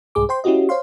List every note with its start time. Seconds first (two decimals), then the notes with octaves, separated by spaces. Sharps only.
0.15 C2 G#2 G#4 D6
0.29 C5 G5 C6
0.44 C#4 E4 F#4 G4 D#5
0.69 C5 C#5 F5 C6